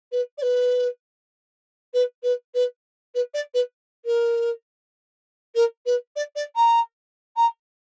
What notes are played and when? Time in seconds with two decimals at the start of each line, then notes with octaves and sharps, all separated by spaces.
0.11 B4
0.37 D5
0.42 B4
1.93 B4
2.23 B4
2.54 B4
3.14 B4
3.34 D5
3.54 B4
4.05 A#4
5.55 A#4
5.85 B4
6.16 D5
6.35 D5
6.56 A#5
7.36 A#5